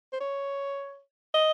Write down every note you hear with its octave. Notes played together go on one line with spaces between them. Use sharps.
C5
C#5
D#5